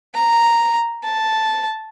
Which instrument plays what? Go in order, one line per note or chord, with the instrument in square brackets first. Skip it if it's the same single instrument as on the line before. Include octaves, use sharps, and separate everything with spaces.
[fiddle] A#5
A5